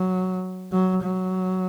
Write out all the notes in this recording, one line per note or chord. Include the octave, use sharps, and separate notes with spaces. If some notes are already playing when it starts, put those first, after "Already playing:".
Already playing: F#3
F#3
F#3